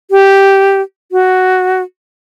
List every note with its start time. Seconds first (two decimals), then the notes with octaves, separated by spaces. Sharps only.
0.11 G4
1.12 F#4